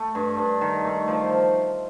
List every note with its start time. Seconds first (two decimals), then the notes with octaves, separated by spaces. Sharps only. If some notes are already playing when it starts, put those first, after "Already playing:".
Already playing: A3
0.15 G2
0.38 G2
0.61 D#3
0.85 A3
1.08 F3